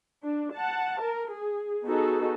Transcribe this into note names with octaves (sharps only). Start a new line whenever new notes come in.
D4
F#5 A5
A#4
G#4
B3 D#4 F#4 G#4 A4